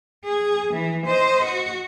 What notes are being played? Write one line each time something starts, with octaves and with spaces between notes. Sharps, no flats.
G#4
E3
C5 D#5
F#4